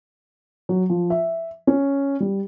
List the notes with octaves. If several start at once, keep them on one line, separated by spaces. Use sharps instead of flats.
F#3
F3
E5
C#4
G3